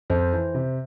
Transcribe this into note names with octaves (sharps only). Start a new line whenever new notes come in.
F2 C5
E3
C3